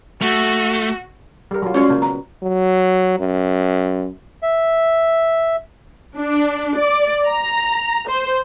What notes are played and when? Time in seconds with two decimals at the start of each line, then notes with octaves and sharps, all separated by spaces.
0.22 A3 F#4
1.51 G3 A#4
1.62 F#3 G3 F4
1.74 G#3 C#4 F4 F#4 C#5 D5
1.89 C#3 A#3
2.02 B3 A#5
2.43 F#3
3.19 F#2
4.42 E5
6.16 D4
6.77 D5
7.26 A#5
8.08 C5